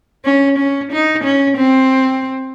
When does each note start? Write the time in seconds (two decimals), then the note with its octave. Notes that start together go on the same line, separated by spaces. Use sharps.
0.25 C#4
0.58 C#4
0.92 D#4
1.24 C#4
1.57 C4